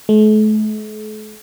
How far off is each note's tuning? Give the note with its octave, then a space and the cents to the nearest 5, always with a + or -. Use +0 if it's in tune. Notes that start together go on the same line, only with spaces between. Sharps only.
A3 -45